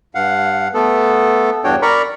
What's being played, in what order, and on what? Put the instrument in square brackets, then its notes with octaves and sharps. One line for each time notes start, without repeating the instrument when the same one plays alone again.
[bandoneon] G2 F5 F#5
A3 B3 A4
E2 G2 D4 F#4 C#5 G5
A#4 D5 A#5 B5 C#6